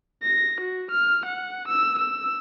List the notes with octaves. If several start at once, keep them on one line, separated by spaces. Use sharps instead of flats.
A#6
F#4
F6
F#5
E6
E6